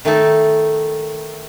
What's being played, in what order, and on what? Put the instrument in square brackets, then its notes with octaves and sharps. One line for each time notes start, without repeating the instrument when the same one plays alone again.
[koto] D#3 A3 D#4 A4